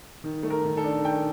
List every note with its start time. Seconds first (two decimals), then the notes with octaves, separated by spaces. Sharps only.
0.24 D#3
0.43 A3
0.50 A#4
0.64 D#3
0.77 A4
0.84 D4
1.04 D#3 G5